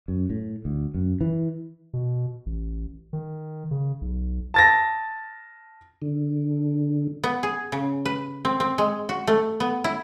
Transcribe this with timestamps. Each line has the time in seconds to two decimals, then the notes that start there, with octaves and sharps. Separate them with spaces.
0.08 F#2
0.30 A2
0.65 D2
0.94 F#2
1.21 E3
1.93 B2
2.46 A1
3.13 D#3
3.71 C#3
4.01 B1
4.54 A5 A6 A#6
6.02 D3
7.24 B3
7.43 G#4
7.72 C#3
8.05 B4
8.45 C4
8.60 C4
8.78 G#3
9.09 F#4
9.27 A3
9.60 B3
9.84 E4